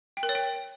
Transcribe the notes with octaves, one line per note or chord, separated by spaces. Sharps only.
G5
A#4
C#5
G5